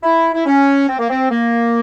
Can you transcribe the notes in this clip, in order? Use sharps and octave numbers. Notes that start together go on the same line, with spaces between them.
E4
E4
C#4
C4
A#3
C4
A#3